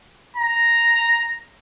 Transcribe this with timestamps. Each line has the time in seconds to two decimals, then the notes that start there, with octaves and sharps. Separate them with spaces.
0.37 A#5